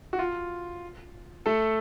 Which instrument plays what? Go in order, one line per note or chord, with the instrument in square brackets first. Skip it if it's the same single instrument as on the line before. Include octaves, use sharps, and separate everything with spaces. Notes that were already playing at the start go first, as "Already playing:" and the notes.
[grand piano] F#4
F4
A3 A4